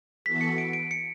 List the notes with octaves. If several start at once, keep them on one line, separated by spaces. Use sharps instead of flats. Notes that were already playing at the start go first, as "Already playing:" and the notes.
E3 B3 F#4 A4 B6
C#7
D7
D7
C#7